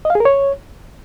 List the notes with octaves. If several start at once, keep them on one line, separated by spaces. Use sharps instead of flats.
D#5
F5
G#4
A#4
C#5